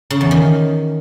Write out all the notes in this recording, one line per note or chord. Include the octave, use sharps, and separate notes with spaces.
C#3
E2
D#3